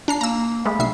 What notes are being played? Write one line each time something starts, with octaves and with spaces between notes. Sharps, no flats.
D4 A#5 C7
A#3 A#5 E6
G#3 A3 B5
B1 E5 C7